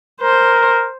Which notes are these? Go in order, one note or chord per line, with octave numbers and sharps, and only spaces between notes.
A#4 C5